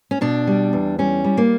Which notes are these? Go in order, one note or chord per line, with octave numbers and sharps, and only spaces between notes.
C#4
B2 D4
G3
E2
G3 C#4
G3
A#3